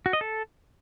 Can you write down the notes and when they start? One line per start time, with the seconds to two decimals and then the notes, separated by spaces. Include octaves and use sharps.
0.06 F#4
0.13 D#5
0.21 A4